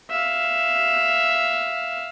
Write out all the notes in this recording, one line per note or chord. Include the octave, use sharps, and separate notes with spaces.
E5 F5